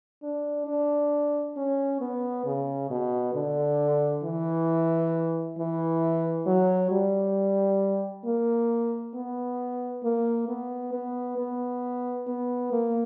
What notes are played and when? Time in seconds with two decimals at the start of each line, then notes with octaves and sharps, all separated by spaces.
0.23 D4
0.67 D4
1.57 C#4
2.01 B3
2.45 C#3
2.90 B2
3.34 D3
4.24 E3
5.58 E3
6.47 F#3
6.91 G3
8.25 A#3
9.14 B3
10.04 A#3
10.48 B3
10.93 B3
11.38 B3
12.27 B3
12.72 A#3